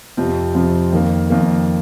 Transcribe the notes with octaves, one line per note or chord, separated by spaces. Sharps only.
F2 C3 F3 C4
F2 C3 F3 C4
F2 D#3 A#3
F2 D#3 A#3